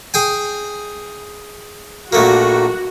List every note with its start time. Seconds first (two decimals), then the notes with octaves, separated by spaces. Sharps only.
0.14 G#4 G5 G#5
2.13 A#1 A3 A#3 F#4